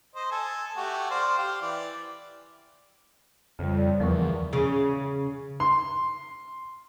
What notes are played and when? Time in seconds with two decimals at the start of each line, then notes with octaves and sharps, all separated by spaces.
0.15 C5 D#5
0.31 A4 G#5
0.77 A3 F#4 G4
1.11 C5 D5 F5
1.38 G4 F5
1.62 E3 D5
3.59 F2 C#3 G3
3.77 D5
4.00 E2 F3 A#4 C#6
4.53 C#3
5.60 C6